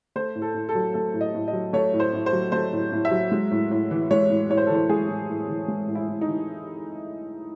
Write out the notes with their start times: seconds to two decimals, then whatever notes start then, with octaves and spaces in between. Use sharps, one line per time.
0.16 A3 C5
0.35 A2
0.42 A4
0.55 A2
0.69 A4
0.75 F#3
0.94 A3 A4
1.14 A2
1.21 D#5
1.35 A2
1.48 D#5
1.53 F#3
1.73 A3 C#5
1.93 A2
2.00 C5
2.14 A2
2.26 C5
2.33 F#3
2.52 A3 C5
2.73 A2
2.92 A2
3.05 E5
3.11 F#3
3.32 G#3
3.51 A2
3.71 A2
3.91 E3
4.11 G#3 C#5
4.30 A2
4.50 A2 C#5
4.57 C5
4.66 A4
4.70 E3 C5
4.89 G#3 G#4
5.09 A2
5.30 A2
5.49 E3
5.68 G#3
5.88 A2
5.95 E4
6.08 A2
6.21 D#4
6.28 E3